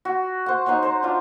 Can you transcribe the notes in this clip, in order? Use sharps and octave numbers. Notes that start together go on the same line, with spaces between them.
F#4
C5 F#5
D#4 C5 C#5 F#5
C5 A#5
D4 F4